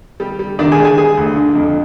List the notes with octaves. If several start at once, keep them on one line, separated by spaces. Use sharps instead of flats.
G3 G4
G3
D#3 D4 D5
G#4 G#5
G#3
G#4 G#5
G3 G#4 G#5
D2
D3
F2